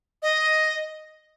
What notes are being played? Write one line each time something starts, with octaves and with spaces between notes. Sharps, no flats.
D#5